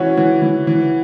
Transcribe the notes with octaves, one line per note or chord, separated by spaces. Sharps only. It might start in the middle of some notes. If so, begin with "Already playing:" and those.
Already playing: E3 C#4 F#4
E3
E3
E3